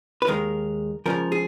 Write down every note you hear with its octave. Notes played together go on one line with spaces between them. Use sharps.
B4
D#2 D#3 G#3 A#4
C#2 C#3 F3 A#4
G#4